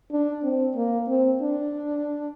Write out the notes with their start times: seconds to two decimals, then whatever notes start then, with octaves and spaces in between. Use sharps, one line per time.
0.11 D4
0.43 C4
0.75 A#3
1.08 C4
1.42 D4